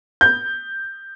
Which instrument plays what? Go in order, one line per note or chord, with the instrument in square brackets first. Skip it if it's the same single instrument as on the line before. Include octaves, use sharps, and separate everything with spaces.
[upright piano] G6